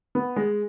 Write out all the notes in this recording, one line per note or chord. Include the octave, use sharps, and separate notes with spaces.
B3
G#3